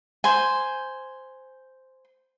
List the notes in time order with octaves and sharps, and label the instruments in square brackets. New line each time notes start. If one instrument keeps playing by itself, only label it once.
[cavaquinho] C5 G#5